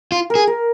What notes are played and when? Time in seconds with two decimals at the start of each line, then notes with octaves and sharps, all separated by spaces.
0.12 F4
0.30 A#4
0.35 G#4
0.47 A#4